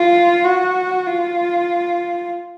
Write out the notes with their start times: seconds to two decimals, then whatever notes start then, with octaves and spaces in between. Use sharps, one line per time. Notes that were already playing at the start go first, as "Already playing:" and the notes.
Already playing: F4
0.44 F#4
1.07 F4